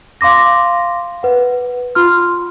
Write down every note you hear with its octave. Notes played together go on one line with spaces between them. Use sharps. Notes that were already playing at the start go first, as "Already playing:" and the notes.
F5 C6 D6 A#6
B4 F#5
F4 C6 F6